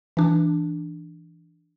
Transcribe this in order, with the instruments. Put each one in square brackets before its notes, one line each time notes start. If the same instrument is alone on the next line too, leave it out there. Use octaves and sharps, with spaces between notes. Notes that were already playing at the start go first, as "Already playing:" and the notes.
[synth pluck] E3 D4